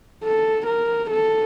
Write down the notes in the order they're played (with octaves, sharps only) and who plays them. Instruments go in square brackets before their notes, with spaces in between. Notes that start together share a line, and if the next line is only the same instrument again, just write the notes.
[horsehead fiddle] A4
A#4
A4